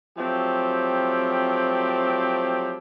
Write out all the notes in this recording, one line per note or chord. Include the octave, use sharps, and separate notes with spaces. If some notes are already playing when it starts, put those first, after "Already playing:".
F3 F#3 A3 C4 G4